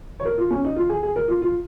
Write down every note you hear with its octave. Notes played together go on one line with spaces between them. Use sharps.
C#5
A#4
F4
C#4
D#4
F4
G#4
G#4
A#4
F4
F4